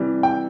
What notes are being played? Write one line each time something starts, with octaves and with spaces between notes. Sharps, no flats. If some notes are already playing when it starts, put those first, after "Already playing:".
Already playing: C3 E3 G3
G5